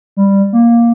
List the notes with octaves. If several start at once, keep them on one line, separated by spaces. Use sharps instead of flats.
G3
A#3